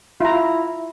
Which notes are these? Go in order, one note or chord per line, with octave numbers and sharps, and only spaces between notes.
E4 F4 A#5